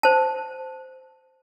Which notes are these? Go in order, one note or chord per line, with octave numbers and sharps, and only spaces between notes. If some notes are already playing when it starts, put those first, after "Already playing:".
C5 A5